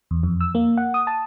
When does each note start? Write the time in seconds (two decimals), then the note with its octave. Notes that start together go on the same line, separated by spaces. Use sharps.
0.11 E2
0.23 F2
0.41 E6
0.55 A#3
0.77 F#5
0.94 D#6
1.07 A5